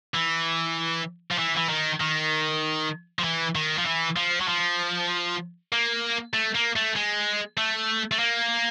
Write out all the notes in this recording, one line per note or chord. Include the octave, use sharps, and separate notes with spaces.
E3
F3
E3
E3
D#3
D#3
F3
E3
D#3
F3
E3
F3
F#3
F3
A#3
A3
A#3
A3
G#3
A3
A3
A#3